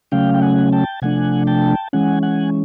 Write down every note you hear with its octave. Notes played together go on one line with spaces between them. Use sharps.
C#3 F#3 A3 C#4 F5 G5
G5
F#5 G#5
G5 A5
C3 F3 A3 D4 F#5 G#5
G5 A5
E3 G#3 C#4 F#5 G#5
F#5 G#5